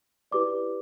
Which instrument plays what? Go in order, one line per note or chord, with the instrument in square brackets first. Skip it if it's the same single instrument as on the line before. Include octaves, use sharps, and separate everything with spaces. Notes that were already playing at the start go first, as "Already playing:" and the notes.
[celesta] E4 G4 B4 D5 D6